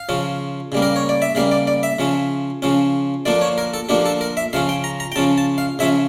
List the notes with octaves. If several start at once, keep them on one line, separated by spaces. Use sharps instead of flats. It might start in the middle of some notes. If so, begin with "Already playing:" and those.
Already playing: F5
C#3 F3 C#4
C#3 G3 A#3
A#4
C#5
D5
E5
C#3 G3 A#3 F5
D5
D5
E5
C#3 F3 C#4
C#3 F3 C#4
D3 F3 A#3 D4 D5
C#5
A#4
A4
D3 F3 A#3 D4 G4
A4
A#4
E5
C#3 F3 C#4 F5
G5
A#5
A#5
G5
C#3 F3 C#4 A5
A5
F5
C#3 F3 C#4 E5